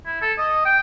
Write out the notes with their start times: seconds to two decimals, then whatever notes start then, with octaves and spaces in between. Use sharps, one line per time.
0.06 E4
0.22 A4
0.38 D#5
0.66 G5